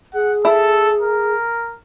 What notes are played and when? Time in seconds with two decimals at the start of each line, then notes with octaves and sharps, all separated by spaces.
0.14 G#4 F#5
0.45 E4 A4
1.01 A#4